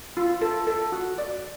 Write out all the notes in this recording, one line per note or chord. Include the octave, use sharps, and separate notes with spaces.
F4
A4
A4
F#4
D5